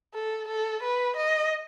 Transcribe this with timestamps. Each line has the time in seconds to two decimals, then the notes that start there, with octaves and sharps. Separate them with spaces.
0.14 A4
0.48 A4
0.83 B4
1.17 D#5